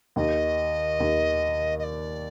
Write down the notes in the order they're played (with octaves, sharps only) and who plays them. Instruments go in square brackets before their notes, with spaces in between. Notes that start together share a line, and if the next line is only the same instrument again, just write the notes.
[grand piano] D#2 D#3 [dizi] D#5
[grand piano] D#2 D#3
[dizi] D#5
D5